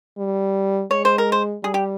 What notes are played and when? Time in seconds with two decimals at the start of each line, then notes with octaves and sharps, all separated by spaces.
0.18 G3
0.91 G#3 C#5
1.05 C5
1.18 A#4
1.32 C5
1.64 G3 G#4
1.74 G4